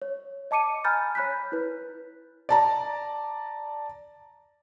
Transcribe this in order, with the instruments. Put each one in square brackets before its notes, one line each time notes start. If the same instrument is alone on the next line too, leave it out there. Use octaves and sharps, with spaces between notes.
[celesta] C#5
D#5 A5 D6 C#7 D#7
G#5 A#5 B5 F6 G6 A6
C#5 B5 F#6 G6 B6
E4 B4
[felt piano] D5 A5 A#5